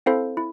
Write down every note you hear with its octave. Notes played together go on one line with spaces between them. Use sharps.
C4 E4 A4 C5 F5
E4